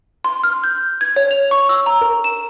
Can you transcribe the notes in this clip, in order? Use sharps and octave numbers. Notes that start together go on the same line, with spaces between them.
C6
F6
G6
G#6
C#5
F7
C#6
E6
A#5
A#4
E7